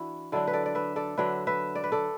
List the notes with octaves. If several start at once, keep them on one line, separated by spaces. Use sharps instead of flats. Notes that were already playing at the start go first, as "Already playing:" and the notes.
Already playing: E3 D4 E4 F#4
D3 F#3 D4 E4 A4
B4
A4 D5
D5
B4 E5
A4 D5
D3 F#3 D4 B4 E5
B4 E5
D5
B4
A4 D5